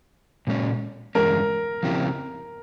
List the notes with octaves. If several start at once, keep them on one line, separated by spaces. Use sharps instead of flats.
A#2 G#3 C#4
G2 E3 G#3 C#4 A#4
C#3 F3 C4 E4 G4